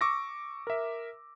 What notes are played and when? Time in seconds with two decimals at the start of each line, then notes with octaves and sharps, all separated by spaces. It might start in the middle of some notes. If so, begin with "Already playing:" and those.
0.01 C#6 D6 E6 A#6
0.67 A#4 E5